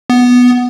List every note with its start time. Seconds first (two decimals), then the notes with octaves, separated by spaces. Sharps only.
0.10 B3